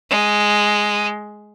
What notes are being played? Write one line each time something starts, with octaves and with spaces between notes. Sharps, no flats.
G#3